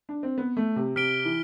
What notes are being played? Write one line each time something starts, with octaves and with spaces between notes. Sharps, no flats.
D4
C4
B3
A3
C3
C3 F6 B6 D7 G7
E3